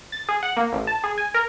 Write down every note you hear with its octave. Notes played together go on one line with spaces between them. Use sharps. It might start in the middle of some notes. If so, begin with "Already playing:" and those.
A6
G#4
F#5
A#3
A1
A5
G#4
G#5
A#4